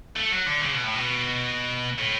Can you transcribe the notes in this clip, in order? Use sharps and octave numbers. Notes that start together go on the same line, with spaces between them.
A3
F#3
D3
C#3
B2
A2
B2
A2